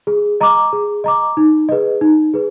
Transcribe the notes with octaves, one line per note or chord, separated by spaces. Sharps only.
G#4
D#5 A#5 D6
G#4
D#5 A#5 D6
D#4
G#4 B4 D#5
D#4
G#4 B4